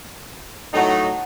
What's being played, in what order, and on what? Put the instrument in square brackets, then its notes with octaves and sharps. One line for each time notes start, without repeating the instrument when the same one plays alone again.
[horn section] A2 F#3 D#4 [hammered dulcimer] F#5 A5